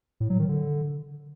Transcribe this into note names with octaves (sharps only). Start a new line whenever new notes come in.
A2
F#3
D#3
D3